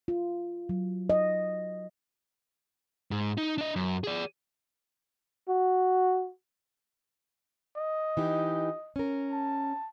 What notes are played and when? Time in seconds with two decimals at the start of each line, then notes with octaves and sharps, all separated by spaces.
0.08 F4
0.69 F#3
1.10 D#5
3.11 G#2
3.37 D#4
3.58 D4 D#5
3.76 F#2
4.04 G#4 D5
5.49 F#4
7.76 D#5
8.17 E3 D#4 G4
8.96 C#4 A#4
9.32 A5